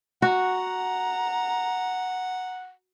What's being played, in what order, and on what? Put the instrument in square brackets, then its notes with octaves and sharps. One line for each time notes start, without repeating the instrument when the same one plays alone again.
[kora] F#4 [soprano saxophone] F#5 [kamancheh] A#5